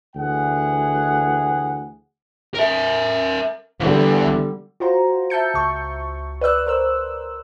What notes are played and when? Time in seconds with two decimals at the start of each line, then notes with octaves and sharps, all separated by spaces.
0.16 D2 E3 G#4 F#5
2.55 A#4 E5
3.80 D3 E3 G3 B3
4.80 F4 F#4 C5 A#5
5.30 E5 A5 G6 C#7
5.54 C#2 C#6
6.41 B4 D5 E6 F#6
6.67 A#4 C5 E6